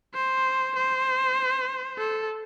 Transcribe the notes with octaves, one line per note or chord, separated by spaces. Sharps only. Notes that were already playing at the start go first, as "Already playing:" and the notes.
C5
C5
A4